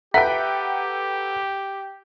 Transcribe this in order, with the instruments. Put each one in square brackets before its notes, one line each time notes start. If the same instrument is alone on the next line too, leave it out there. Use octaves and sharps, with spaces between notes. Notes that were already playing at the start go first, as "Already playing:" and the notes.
[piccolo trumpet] G4 [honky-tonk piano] A4 B4 G5 [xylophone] E5 [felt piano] F#5 A#5 B6